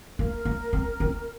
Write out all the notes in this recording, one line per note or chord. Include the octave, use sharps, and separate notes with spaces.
A#3 A#4
A#3
C4
C4